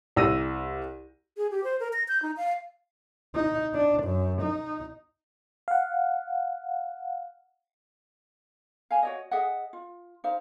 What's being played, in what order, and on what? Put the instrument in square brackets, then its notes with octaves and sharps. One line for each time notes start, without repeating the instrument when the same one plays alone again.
[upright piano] C2 E6 A#6 D#7
[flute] G#4
G4
C5
A#4
A#6
G6
D#4
F5
[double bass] D#4
D4
F#2
D#4
[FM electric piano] F5 F#5
[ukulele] F5 G#5
F#4 C#5 D#5
G#4 D#5 E5 F#5
F4
D#4 C5 F5